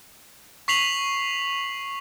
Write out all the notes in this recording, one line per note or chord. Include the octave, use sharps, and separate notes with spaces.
C#6 B6 C7 F7 F#7